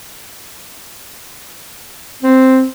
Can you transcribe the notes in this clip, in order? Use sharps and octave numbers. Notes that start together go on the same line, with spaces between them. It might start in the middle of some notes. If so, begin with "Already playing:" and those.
C4